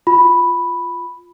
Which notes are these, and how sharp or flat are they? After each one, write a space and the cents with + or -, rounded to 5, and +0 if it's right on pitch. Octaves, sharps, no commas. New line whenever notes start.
F4 +0 B5 +0